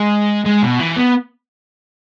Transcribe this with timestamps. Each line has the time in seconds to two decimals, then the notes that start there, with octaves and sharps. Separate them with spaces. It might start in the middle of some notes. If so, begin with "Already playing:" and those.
Already playing: G#3
0.45 G#3
0.62 B2
0.79 E3
0.96 B3